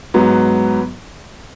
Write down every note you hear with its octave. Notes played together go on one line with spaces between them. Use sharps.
G#2 F#3 B3